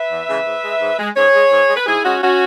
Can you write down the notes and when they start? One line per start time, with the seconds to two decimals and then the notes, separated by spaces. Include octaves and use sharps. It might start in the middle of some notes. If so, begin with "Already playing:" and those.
Already playing: B4 E5
0.10 E2
0.28 C#3 E3 G#3
0.45 G#2
0.63 G#3
0.81 G#2
0.98 G#3
1.16 G#2 G#4 C#5
1.34 G#3
1.51 G#2
1.69 G#3
1.76 B4
1.86 G#2 E4 G#4
2.04 G#3 C#4 F#4
2.22 C#4 F#4